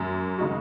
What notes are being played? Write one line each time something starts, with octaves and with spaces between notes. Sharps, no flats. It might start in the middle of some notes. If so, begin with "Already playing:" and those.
Already playing: F#2
C#3 G#3 D#4 F#4